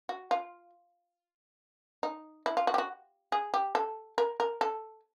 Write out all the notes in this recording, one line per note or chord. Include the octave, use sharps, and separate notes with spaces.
F#4
F4
D#4
E4
F4
F#4
G4
F#4
G#4
G4
A4
A#4
A#4
A4